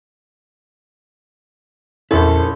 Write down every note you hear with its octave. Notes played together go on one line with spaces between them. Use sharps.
A#1 E2 C#4 E4 A4 A#4 C5 C#5